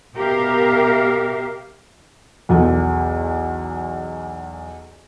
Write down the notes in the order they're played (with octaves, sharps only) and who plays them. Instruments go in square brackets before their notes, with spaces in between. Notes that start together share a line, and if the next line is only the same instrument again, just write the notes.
[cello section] B2 G4 A#4 E5 F5
[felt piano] B1 E2 A4